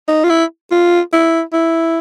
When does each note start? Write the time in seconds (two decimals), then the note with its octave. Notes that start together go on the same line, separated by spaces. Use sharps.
0.08 D#4
0.24 F4
0.30 E4
0.71 F4
1.13 E4
1.53 E4